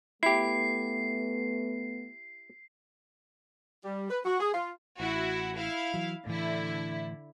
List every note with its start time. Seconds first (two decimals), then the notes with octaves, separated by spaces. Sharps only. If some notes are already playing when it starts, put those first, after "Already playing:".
0.23 A3 B3 E4 G4 C7
3.84 G3
4.10 B4
4.25 F#4
4.40 G#4
4.54 F4
5.00 A1 E4 F#4
5.57 E4 F5
5.94 E3 F#3
6.26 A2 D3 E3 E4